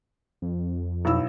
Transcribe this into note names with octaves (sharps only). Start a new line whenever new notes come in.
F2
B1 E4 E6